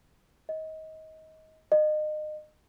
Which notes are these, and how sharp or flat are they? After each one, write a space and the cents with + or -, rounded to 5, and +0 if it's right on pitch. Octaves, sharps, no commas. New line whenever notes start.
D#5 +25
D#5 -30